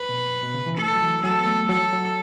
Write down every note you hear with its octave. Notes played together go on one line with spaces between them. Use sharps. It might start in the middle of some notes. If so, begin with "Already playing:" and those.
Already playing: B4
B2
B2
C#3
E3
A3 A4
F#3
E3
F#3 A4
B3
A3
F#3 A4
F#3